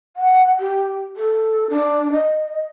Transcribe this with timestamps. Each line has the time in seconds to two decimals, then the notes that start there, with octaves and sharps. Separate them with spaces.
0.17 F#5
0.60 G4
1.17 A4
1.70 D4
2.13 D#5